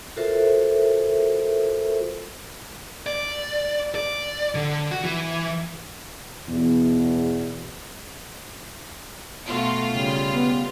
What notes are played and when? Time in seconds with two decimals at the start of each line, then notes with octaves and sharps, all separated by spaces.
0.16 F4 F#4 A4 A#4 C5 E5
3.06 D5
3.95 D5
4.55 D3
4.91 F#4
5.04 E3
6.48 E2 B2
9.46 B2 A3 F4 F#4
9.92 C#3 G3
10.32 B3